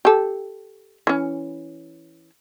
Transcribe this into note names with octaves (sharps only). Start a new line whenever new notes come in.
G4 A4
E3 C#4